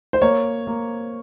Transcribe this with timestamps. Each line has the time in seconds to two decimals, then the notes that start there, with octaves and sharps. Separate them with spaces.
0.13 C5
0.22 A#3 C#5
0.67 A#3